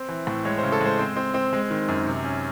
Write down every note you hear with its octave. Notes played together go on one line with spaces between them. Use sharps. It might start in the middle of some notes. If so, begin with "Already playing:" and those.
Already playing: C4
E3
A2
G#3 C#5
C#3 C5
A4
G#3 C5
C4
C4
C4
G#3
D#3
F#2
C3
C#4